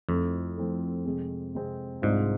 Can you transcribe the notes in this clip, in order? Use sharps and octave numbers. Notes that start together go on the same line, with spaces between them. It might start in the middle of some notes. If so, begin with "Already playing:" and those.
F2 F3 A3 C4 E4 A4
F3 A3 C4 E4 A4
C3 G#3 C4 G#4
C3 G#3 C4 G#4
C2 G#2 C3 G#3 D4 F4